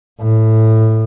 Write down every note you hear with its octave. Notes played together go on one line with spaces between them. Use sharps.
A2